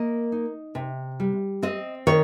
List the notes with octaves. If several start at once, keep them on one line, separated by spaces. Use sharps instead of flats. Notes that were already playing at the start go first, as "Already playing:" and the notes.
Already playing: A#3 D#5
D#4
C3
G3
C4 D#5
D#3 C#5